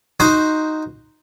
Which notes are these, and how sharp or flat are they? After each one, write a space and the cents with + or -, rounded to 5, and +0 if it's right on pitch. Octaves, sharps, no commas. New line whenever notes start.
D#4 +0 F#4 -5 C5 +0